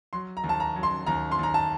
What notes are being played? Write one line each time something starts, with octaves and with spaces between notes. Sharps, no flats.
F#3 C6
A#5
D#2
A5
A#5
F#3
C6
D#2 A#5
C6
D#2 A#5
A5